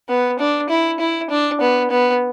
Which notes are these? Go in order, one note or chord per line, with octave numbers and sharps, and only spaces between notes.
B3
D4
E4
E4
D4
B3
B3